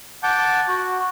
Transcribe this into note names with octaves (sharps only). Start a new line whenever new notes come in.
F#5 A5 D6 G6
F#4